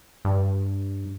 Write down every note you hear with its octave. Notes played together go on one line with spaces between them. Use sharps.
G2